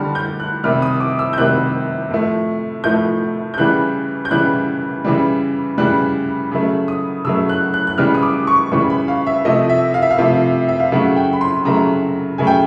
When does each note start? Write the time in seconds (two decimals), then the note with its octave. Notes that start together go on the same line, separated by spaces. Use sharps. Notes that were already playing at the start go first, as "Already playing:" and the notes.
Already playing: D3 G3 F6
0.15 G6
0.40 F#6
0.64 C3 D#3 G3 F6
0.82 D#6
1.00 D6
1.19 E6
1.33 G6
1.38 C3 D#3 G3 F#6
2.11 A2 F3 A3
2.84 A2 F3 A3 G6
3.54 G6
3.57 C#3 E3 G3 F#6
4.25 G6
4.31 C#3 E3 G3 F#6
5.05 C#3 E3 G3
5.78 C#3 E3 G3 F#6
6.51 C#3 F#3 A3
6.88 D#6
7.25 C#3 F#3 A3 E6
7.49 F#6
7.74 F#6
7.87 F#6
7.98 C#3 E3 G3 F6
8.15 D#6
8.23 D6
8.47 C#6
8.72 C#3 E3 G3 C#6
8.90 B5
9.08 F5
9.27 E5
9.45 C3 F3 A3 D#5
9.69 E5
9.94 F5
10.02 E5
10.11 F5
10.18 C3 F3 A3
10.68 E5
10.80 F5
10.92 C#3 F#3 A3 F#5
11.16 G5
11.33 B5
11.41 C6
11.65 C#3 F#3 A3 A#5
12.38 C#3 F#3 A3 G#5
12.47 G5